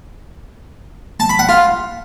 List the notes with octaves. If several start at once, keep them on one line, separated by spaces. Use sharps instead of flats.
A5
B5
F#5
F4